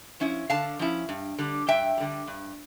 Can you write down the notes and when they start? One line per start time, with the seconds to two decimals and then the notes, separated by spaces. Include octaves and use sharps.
0.20 F3 C#4 E4
0.50 D3 F5 A5
0.79 F3 C#4 E4
1.09 G2
1.39 D3 G3
1.68 G2 E5 G5
1.97 D3 G3
2.27 G2